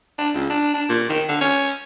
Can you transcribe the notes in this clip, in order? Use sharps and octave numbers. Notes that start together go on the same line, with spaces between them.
D4
C#2
D4
D4
A#2
D#3
D3
C#4